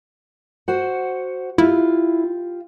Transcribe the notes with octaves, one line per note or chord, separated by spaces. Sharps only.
F#4 C5 F#5
E4 F4 G4